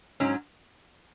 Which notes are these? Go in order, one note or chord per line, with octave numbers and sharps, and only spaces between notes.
G#2 F#3 C#4